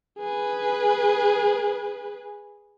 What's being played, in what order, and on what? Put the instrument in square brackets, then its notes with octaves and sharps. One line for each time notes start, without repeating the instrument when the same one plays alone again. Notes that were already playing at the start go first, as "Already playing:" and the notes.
[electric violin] G#4 B4